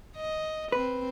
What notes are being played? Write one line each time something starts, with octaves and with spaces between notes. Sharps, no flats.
D#5
C4 B4